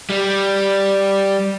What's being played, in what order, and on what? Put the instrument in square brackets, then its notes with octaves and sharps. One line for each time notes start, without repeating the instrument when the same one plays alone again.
[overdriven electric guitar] G3